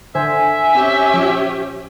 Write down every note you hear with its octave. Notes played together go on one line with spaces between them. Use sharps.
D3 C5 E5 G#5
C4 C#4 G4
F3 C#5